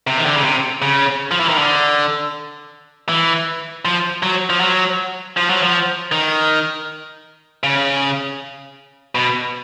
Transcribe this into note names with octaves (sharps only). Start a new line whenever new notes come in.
C3
D#3
D3
C#3
C3
C#3
F3
E3
D#3
D3
E3
F3
F#3
F3
F#3
F3
F#3
F3
D#3
C#3
B2